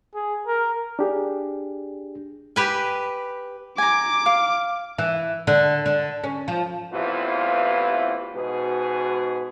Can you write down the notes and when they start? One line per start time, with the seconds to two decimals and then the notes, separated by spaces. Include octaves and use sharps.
0.14 G#4
0.47 A#4
0.99 D4 G4 G#4
2.56 G4 B4 G#5
3.78 G#5 A#5 D6
4.26 F5
4.98 E3
5.47 D3
5.86 D3
6.24 C#4
6.48 F3
6.92 A1 E2 C3 E3 F4 B4
8.35 G#2 B2 F#4 G#4 B4